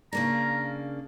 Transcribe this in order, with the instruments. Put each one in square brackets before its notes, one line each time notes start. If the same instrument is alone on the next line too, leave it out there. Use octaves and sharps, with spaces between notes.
[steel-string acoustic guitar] C#3 A#3 D4 [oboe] A#5